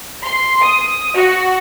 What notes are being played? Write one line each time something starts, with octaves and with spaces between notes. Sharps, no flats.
C6
D#6
F#4